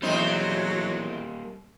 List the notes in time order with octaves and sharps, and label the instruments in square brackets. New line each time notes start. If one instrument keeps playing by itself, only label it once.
[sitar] E2 C4 D#4 [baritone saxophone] F#3 [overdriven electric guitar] G3 A#3